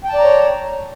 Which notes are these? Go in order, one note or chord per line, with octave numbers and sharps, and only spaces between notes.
C#5 D5 G5 A5 A#5